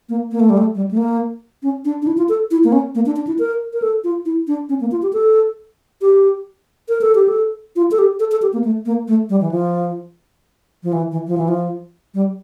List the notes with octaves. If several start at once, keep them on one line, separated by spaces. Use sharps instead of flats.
A#3
A#3
A3
G3
A3
G3
A3
A#3
C#4
D4
D4
E4
F4
A4
E4
A#3
C#4
A#3
D4
D4
E4
A#4
A#4
A4
F4
E4
D4
C#4
A#3
F4
G4
A4
G4
A#4
A4
G4
A4
F4
A4
G4
A4
A4
G4
A#3
A3
A#3
A3
G3
E3
F3
F3
E3
E3
F3
E3
F3
G3